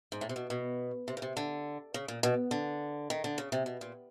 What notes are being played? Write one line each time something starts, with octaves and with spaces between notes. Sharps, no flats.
G#2
A2
C3
B2
B2
C3
C#3
C3
D3
C#3
A#2
B2
D3
D#3
D3
C#3
C3
B2
A#2